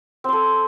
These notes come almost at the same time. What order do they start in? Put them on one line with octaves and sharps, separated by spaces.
C4 C5 A4